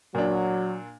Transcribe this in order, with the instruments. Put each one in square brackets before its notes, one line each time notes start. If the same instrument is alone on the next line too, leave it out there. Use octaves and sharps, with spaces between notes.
[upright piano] A#2 D4 [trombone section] F#3